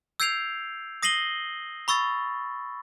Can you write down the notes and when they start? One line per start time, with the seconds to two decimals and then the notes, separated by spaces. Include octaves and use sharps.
0.20 E6 G6 G#6 C7 D7 F7
1.03 D#6 A#6 C7 D#7 F#7 G7
1.88 B5 C#6 E6 A6